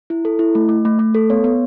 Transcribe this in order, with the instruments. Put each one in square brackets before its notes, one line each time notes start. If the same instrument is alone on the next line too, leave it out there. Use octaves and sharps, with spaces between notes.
[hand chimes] E4
A4
E4
A3
A3
A3
A3
A4
B3 C#5
B3